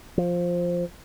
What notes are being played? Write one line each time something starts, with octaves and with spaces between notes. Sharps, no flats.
F3